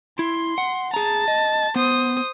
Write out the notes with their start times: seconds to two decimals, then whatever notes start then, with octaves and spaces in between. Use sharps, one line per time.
0.19 E4 C6
0.58 F#5
0.94 G#4 A5 A#5
1.28 D#5
1.76 B3 C5 D#6